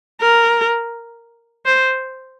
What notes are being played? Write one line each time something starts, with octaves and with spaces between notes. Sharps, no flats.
A#4
C5